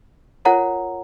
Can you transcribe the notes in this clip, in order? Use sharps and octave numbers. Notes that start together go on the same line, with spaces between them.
F4 A#4 C#5 F#5 A#5